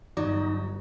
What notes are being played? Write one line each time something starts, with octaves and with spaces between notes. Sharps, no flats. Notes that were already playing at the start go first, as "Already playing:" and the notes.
G1 F#3 D#4 D5